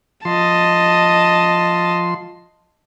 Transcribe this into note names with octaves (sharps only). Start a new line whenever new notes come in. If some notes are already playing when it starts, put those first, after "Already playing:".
F3 D#5 A5 C6